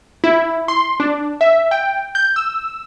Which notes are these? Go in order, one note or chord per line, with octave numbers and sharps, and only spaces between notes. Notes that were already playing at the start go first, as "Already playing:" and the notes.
E4
C6
D4
E5
G5
G6
E6